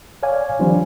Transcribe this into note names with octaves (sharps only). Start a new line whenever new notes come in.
C#5 D5 F5 G#5
D#3 F3 G3 C4 D4 C5